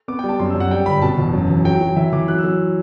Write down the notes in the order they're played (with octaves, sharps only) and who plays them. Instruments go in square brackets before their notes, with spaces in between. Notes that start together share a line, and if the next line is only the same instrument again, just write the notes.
[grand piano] B3 D6
G5
G3
A5
F#2 C6
E6
F#2
F#5
G3 G5
G1 B5
B2 A5
E1
F#2
E3
F#3 G5
F#3
E3 E5
E3 D6
F#3 F#6
E6
F#3